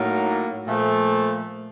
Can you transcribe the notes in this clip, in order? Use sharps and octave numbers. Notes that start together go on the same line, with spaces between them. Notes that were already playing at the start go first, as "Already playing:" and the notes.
Already playing: A2 F#3 A#3 D#4
A#2 F3 A3